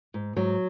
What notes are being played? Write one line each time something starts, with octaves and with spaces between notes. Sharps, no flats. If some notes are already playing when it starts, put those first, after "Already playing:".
G#2
G#2 F#3